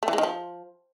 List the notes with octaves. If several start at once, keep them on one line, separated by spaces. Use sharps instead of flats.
A3
E3
G#3
D#3
F3